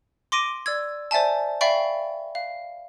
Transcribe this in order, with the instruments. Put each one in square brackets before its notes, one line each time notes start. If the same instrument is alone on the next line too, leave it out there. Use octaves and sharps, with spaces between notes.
[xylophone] C6 D6 A#6 D7 D#7
D5 E6 G#6
C5 D5 E5 G#5 A5
D5 E5 F5 G5 B5 C#6
F5